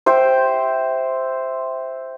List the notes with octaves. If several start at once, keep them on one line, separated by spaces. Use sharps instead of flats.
C5 E5 G5